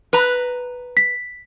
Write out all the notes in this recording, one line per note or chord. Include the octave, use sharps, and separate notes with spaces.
B4 A#5
B6